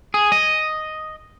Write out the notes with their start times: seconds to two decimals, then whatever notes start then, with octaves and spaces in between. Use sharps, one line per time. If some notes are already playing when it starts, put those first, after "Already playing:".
0.14 G#4
0.32 D#5